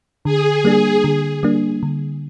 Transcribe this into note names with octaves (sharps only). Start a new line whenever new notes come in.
D3 G#4
G3 A#3 D4
D3
G3 A#3 D4
D3